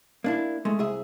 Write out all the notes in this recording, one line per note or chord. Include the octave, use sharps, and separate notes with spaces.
A#3 D4 E4
G#3 A3
C2 G#4 E5